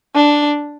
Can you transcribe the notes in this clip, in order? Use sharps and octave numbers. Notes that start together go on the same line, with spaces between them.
D4